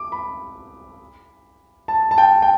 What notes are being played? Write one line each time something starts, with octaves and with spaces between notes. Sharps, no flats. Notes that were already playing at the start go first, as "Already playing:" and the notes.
Already playing: D6
B5
A5
A5
G5
G5